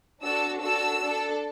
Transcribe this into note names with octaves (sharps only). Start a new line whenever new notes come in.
D4 F#4 A4 E6
D4 F#4 A4 E6
D4 A4